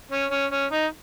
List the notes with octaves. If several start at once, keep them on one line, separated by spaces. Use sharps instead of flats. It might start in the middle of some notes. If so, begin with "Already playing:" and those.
C#4
C#4
C#4
D#4